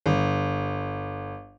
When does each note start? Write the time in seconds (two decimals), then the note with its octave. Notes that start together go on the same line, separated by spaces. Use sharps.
0.06 G1